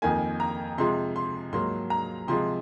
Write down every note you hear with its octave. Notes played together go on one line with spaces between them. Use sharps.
F2 D#3 A#3 G#5
A#5
C3 F3 G#3 C6
C6
G#2 F#3 A#3 C6
A#5
C3 F3 G#3 C6